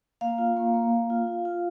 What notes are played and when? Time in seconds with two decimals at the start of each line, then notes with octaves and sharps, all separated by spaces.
0.21 A#3 F5
0.38 F4
0.56 A#3
0.74 A#3
0.92 A#3
1.10 F4
1.27 F4
1.45 F4